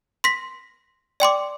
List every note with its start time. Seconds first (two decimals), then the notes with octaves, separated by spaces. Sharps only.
0.24 C6 A#6 B6
1.20 D5 G5 C6 D6